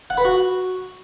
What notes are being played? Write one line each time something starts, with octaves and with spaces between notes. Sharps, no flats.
F#5
B4
F#4